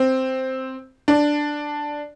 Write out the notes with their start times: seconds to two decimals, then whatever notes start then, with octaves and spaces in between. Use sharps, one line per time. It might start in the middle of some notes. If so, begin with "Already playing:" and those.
Already playing: C4
1.08 D4